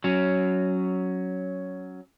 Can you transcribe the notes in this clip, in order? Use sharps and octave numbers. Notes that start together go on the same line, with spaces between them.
F#3 C#4